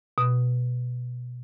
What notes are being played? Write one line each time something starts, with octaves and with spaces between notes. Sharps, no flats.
B2